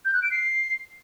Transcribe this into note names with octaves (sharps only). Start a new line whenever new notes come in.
G6
F#6
D7
C7